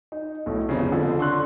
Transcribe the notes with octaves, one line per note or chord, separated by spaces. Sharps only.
D#4
B1 A2 A3
G1 F2 C#3
F2 D3
D3 C6 C#6 F#6